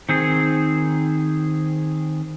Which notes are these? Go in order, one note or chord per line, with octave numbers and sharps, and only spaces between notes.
D#3 C4 G#4